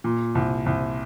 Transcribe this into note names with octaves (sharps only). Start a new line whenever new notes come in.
A#2
C2
C2